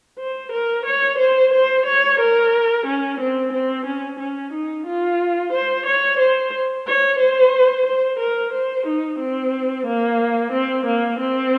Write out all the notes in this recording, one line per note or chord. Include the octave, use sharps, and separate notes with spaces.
C5
A#4
C#5
C5
C5
C#5
A#4
C#4
C4
C4
C#4
C#4
D#4
F4
C5
C#5
C5
C#5
C5
C5
A#4
C5
D#4
C4
A#3
C4
A#3
C4